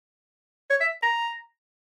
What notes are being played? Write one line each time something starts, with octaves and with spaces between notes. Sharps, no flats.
C#5
E5
A#5